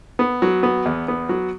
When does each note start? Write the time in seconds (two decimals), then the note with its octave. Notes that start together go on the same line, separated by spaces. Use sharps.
0.19 B3
0.42 F#3
0.63 B3
0.86 E2
1.08 B3
1.29 F#3